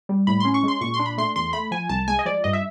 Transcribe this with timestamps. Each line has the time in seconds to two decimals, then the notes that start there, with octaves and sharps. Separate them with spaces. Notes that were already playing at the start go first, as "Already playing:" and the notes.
0.09 G3
0.27 A2 B5
0.40 C#4 C6
0.54 C#6
0.63 G#3 C6
0.81 A#2 C#6
0.94 C6
0.99 D4
1.06 B5
1.18 A3 C6
1.36 E2 C6
1.53 A3 B5
1.71 F3 G#5
1.89 C2 A5
2.08 G#3 G#5
2.19 D#5
2.26 F3 D5
2.44 G2 D#5
2.53 E5